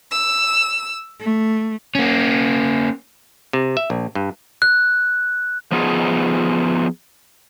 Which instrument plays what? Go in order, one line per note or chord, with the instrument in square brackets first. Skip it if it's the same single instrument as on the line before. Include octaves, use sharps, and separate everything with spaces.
[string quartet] E6
A3
[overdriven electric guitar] A#3 C#4
[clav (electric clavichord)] C3
E5
A#1
G2
[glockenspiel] F#6
[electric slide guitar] F3 B3 D#4 F4 G#4